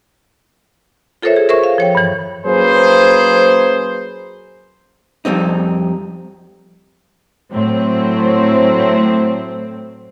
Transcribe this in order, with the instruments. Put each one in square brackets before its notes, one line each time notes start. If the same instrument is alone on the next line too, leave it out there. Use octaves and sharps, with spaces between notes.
[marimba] F4 A4 A#4 C5 C#5 E5
G#4
A#4 C5 E5 C#6
F5
F3 C#5 G5
G2 E3
[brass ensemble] F#3 A#3 C#4 G#4 B4 C5
[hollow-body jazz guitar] F2 G3 C4 D#4
[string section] A2 F#3 C4